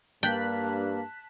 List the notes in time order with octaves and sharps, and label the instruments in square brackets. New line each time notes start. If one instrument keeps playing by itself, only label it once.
[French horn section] G2 [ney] A#3 [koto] G5 [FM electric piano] A5 F#6 B6